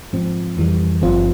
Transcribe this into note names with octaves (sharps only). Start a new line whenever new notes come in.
G#2 F3 C4
F2 E3 G3
G#1 G2 F3 C4 F4